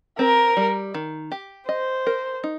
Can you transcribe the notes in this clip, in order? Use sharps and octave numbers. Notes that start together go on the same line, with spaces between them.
C4 A#4
G3
D#3
G4
C5 D#5
A#4
D#4